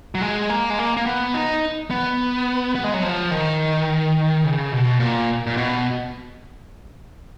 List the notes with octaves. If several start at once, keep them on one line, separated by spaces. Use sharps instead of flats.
F#3
G#3
A#3
G#3
A#3
A#3
B3
D#4
B3
B3
G#3
F#3
F3
D#3
C#3
B2
A#2
A#2
B2